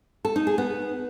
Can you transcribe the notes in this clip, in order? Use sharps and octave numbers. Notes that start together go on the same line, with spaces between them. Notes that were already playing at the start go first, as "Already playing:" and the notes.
A4
D#4
G#4
B3